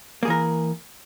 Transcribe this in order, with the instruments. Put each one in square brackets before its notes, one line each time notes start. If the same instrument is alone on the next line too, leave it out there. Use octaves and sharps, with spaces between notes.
[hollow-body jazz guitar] A#3
G#4
E3
A#4